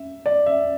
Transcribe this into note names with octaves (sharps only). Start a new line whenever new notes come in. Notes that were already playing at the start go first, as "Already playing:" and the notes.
Already playing: E5
D5
E5